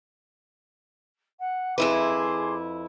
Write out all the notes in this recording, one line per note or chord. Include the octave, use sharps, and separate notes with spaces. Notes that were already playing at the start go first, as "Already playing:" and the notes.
F#5
F2 E4 G#4 B4 C6 D6